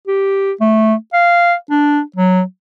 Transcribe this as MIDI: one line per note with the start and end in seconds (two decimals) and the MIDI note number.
0.08 0.52 67
0.60 0.94 57
1.13 1.54 77
1.70 2.01 62
2.16 2.42 54